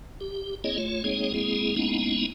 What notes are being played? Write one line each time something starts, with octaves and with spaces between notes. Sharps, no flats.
G4
A#3 C4 E4 G#4 C#5 D#5
A3 F4 C#5
G#3 A#3 C4 D#4 G#4 C#5
G#3 A#3 C4 E4 G#4
G#3 A#3 B3 C#4 D#4 E4